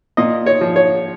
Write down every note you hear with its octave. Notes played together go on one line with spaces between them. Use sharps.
A#2 D#5
C#5
F3
C#5